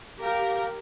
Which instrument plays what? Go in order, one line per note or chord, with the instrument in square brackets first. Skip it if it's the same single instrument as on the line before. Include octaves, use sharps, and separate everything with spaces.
[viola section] G4 A#4 [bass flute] F5